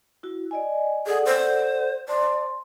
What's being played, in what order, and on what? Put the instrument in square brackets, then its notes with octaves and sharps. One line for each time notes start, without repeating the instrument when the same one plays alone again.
[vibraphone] E4 F#4
D5 D#5 G#5
[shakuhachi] G#4 [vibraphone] A4 D5 F#5
[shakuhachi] C5
[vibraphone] C5 A5 C6 [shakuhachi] D5